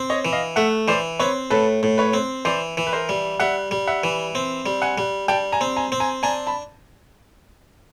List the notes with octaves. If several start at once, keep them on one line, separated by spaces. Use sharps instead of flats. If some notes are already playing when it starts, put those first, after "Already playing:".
Already playing: C4
C#5 D#5
E3
D#5 F5
A3 E5 F#5
E3 C5 D5
C4 B4 C#5
A2 A4 B4
A2
B4 C#5
C4
E3 C5 D5
E3
B4
A#4 C5
G3
G3 E5 F#5
G3
E5 F#5
E3
C4
G3
F#5 G#5
G3
G3 G5 A5
G#5 A#5
C4
G#5 A#5
C4
G#5 A#5
D4 G#5 A#5
A5 B5